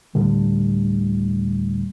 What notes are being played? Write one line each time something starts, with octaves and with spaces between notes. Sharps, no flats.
D1 A2 D3 G3